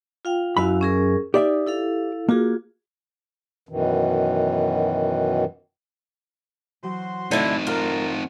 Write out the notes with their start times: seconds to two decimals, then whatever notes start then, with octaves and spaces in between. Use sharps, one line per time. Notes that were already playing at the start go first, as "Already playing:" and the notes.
0.25 F4 F5 G5
0.57 F#2 E4 F#4 F5 B5
0.81 C#4 G#4 A#4
1.34 D#4 G4 D5 E5
1.67 E4 A4 F5
2.29 A#3 F4 F#4 G#4
3.69 F#2 B2 D#3 E3
6.83 E3 F#3 F#4 C5 C6
7.31 D3 A3 C4 D#4 E4
7.67 F4 A#4 F#5 A5 C6